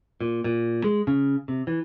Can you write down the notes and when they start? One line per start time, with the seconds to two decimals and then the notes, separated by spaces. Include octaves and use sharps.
0.21 A#2
0.44 A#2
0.84 G#3
1.07 C#3
1.48 C3
1.67 E3